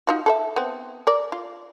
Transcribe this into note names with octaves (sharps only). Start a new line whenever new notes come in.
D#4 F4 F#4
A4 B4 E5
B3 C4
A#4 D5
F4